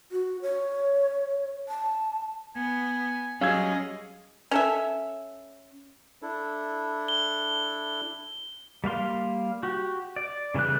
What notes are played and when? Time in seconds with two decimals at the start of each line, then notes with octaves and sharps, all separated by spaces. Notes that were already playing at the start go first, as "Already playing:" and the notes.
0.12 F#4
0.42 C#5
1.69 A5
2.56 B3 G#5
3.41 F#3 G3 C#4 G#4 D#5 F5 E6 G#6
4.51 C#4 A4 E5
6.22 D4 E4 A4
7.08 G7
8.84 G3 A#3 F5 C6
9.63 F#4 G4
10.16 D5
10.54 C#3 E3 G3 A3 F#6